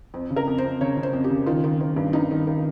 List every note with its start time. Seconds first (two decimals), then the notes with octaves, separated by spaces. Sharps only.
0.14 F2 C4
0.30 C#3
0.36 A#4
0.48 F2
0.58 C5
0.64 F2
0.81 C#3 C#5
0.97 C#3
1.03 C5
1.13 F2
1.24 G4
1.30 C#3
1.46 D#3 F4
1.64 D#3
1.81 D#3
1.96 G2
2.13 G2 D#4
2.31 D#3
2.47 D#3